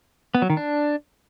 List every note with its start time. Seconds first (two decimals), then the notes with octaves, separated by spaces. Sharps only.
0.35 B3
0.42 F#3
0.50 D#3
0.57 D4